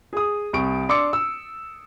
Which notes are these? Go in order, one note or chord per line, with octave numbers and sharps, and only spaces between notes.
G#4 D#6
C2 C#6 D7
D4 C6 D6 E6 C#7
E6